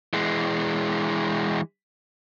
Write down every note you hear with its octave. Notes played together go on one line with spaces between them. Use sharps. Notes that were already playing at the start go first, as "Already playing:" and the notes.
E3 G#3